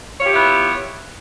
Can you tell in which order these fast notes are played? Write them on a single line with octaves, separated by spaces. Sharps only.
C#5 F4 G4 E4 B3